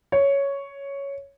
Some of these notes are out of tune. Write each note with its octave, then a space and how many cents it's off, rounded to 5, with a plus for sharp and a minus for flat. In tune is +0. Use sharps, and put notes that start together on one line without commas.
C#5 +5